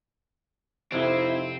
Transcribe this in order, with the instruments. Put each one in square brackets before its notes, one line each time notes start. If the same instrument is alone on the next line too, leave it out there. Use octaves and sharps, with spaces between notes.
[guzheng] F2 C3 E5 [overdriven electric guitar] C4 [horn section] D#4 E4